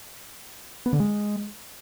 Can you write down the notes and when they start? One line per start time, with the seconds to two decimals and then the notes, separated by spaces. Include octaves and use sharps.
0.86 B3
0.93 D3
1.00 G#3